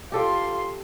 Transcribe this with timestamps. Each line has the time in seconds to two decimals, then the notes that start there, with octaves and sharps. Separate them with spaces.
0.12 F4 G4 A4 D5 C6